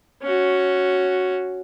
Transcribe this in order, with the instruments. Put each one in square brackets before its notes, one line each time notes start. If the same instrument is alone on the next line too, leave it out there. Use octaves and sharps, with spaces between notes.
[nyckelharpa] C#4 F#4